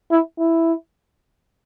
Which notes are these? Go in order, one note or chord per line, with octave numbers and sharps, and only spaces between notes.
E4
E4